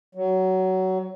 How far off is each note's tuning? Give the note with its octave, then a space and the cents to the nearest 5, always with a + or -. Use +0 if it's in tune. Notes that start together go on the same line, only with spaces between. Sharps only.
F#3 +20